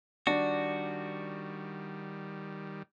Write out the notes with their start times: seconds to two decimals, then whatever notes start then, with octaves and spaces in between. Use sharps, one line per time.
0.27 D#3 G3 D4 F#4